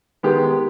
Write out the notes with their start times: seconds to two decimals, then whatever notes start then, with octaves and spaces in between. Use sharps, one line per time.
0.23 D#3 G#3 B3 G4